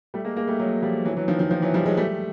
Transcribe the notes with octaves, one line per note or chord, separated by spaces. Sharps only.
G3 A3
G#3 A#3
G#3 A#3
G3 A3
F#3 G#3
F3 G3
E3 F#3
E3 F#3
D#3 F3
D#3 F3
D#3 F3
E3 F#3
F3 G3
F#3 G#3
G3 A3